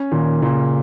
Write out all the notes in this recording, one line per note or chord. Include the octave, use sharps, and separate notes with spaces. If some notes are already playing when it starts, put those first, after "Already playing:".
Already playing: C#4
A#2 D#3
A#2 C#3